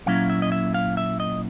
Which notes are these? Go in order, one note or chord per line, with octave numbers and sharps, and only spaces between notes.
A#2 F#3 A#3 C#4 E4 F5
E5
D#5
E5
F5
E5
D#5